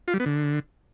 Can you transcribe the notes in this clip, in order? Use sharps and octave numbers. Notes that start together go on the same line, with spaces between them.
F4
G3
B3
D3